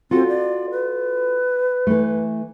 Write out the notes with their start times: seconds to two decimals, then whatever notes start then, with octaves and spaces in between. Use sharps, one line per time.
0.11 C4 F4 F#4 A4
0.28 D5
0.71 B4
1.87 E3 A3